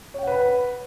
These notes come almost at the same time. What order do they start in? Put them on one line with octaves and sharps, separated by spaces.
C#5 G5 F#5 B4 B5